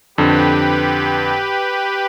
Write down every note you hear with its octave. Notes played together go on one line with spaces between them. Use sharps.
F2 D3 G4 B4